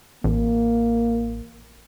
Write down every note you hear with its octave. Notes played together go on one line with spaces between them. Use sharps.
A1 A#3